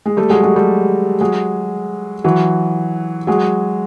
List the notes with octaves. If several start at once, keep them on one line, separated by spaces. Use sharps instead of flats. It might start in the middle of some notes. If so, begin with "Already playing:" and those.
G#3
G3 A3
F#3 G#3
F#3 G#3
G3 A3
F#3 G#3
E3 F#3
F#3 G#3